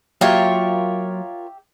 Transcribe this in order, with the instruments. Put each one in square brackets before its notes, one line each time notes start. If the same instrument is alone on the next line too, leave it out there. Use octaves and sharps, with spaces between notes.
[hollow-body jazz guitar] F#3 A#3 D5 [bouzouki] F4 A#4 C#5 [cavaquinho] G4 E5